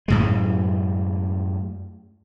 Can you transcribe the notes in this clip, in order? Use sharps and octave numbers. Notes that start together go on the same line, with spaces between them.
F#2 A2 G#3